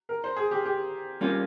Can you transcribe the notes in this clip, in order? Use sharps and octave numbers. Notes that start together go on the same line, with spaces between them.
A#4
C5
G#4
G4
G4
G3 A#3 C#4 F4